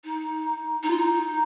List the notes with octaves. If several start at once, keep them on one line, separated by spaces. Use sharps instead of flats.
D#4
D#4
F4
D#4